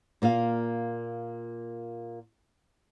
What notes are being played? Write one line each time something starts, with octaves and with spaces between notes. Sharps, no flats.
A#2 A#3 F4 F5